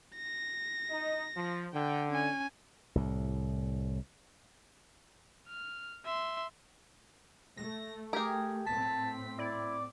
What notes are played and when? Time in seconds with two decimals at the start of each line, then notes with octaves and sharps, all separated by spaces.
0.16 A#6
0.90 D#4 D#5
1.36 F3
1.73 D3 G5
2.09 C#4 G#5
2.95 C2 A2
5.47 F6
6.05 E5 C6
7.57 A3 A#6
8.13 G4 G#4 A#4
8.67 A2 C4 A5 B6
9.39 E4 D5